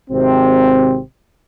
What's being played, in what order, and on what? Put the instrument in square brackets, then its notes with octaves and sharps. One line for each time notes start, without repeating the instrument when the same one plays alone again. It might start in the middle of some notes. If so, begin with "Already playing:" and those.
[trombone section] G#1 C3 C4